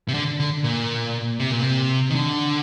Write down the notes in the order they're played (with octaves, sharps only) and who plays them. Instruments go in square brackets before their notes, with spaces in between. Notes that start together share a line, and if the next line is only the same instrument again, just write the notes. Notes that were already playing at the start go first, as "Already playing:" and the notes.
[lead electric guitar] C3
D3
D3
A#2
C3
A#2
C3
D#3
D3